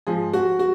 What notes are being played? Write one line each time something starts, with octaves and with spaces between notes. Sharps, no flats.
G#2 F3 G#4
F#4
F#4